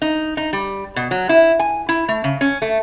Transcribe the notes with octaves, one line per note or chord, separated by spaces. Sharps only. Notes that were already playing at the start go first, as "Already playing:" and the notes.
D#4
D#4
G3
B2
F#3
E4
G#5
E4
A3
C#3
C#4
A3